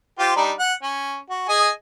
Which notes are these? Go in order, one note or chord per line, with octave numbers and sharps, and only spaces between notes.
F4 G4 C5
G3 D4 D#4
F#5
C#4
F#4
G#4 D#5 G#5